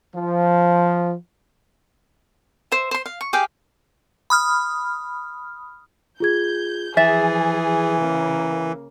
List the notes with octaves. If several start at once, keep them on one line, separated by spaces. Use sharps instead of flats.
F3
C5 E5
C5 C6
F5
C#6
G4 G#4 F5 G5
B5 D#6 F6
F4 G#4 G6 G#6
E3 F3 G#4 E5 A6
C#3 A#3